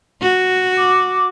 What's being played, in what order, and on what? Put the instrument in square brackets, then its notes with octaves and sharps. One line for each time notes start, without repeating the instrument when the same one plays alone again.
[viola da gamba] F#4
[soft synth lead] D6